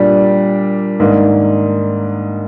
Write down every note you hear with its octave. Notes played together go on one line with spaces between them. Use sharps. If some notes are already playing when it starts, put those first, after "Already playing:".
Already playing: A#2 G3 D4
G#2 D#3 A#3 D4